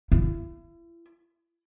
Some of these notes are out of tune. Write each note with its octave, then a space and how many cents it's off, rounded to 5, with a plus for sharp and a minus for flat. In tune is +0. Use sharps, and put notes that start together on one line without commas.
E4 +35